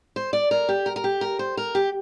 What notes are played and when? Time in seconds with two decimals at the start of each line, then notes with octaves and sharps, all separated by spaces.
0.16 C5
0.33 D5
0.51 A#4
0.69 G4
0.86 A#4
0.96 A#4
1.04 G4
1.21 A#4
1.39 C5
1.57 A#4
1.75 G4